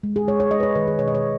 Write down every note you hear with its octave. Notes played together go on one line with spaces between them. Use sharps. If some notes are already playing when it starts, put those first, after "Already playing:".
G#3
G#4
G#3 C#5
C#5
G#3 D#5
B4
C#5
D#3 B4
G#4
B2 C#5
D#5
C#5